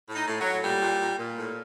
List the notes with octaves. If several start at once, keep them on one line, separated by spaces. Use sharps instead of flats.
A2
D#4
A2
F#3
A2
A#2 G3
A#2
A#2
A#2
A2